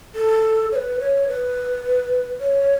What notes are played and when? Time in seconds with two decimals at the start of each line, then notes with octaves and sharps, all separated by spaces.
0.15 A4
0.72 C#5
0.76 B4
1.00 C#5
1.28 B4
2.40 C#5